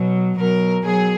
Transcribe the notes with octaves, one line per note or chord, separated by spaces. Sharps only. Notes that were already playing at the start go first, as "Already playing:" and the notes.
Already playing: B2 F#3
B2 F#3 A#4
B2 F#3 G#4